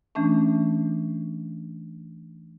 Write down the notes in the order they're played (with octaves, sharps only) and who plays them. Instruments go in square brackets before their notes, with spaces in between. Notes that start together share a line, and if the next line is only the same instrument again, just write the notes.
[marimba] E3 A3 C#4 D4